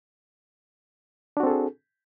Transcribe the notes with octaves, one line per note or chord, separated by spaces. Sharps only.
C4 D4 F#4 G#4 A4